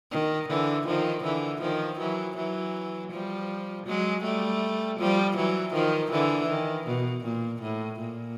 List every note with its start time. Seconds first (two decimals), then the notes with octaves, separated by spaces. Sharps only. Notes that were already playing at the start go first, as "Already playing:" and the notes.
0.12 D#3
0.49 D3 E3
0.87 D#3 F3
1.24 D3 E3
1.61 D#3 F3
1.99 E3 F#3
2.36 E3 F#3
3.11 F3 G3
3.86 F#3 G#3
4.24 G3 A3
4.99 F3 G3
5.36 E3 F#3
5.74 D#3 F3
6.11 D3 E3
6.49 D#3
6.87 B2
7.24 A#2
7.62 A2
7.99 A#2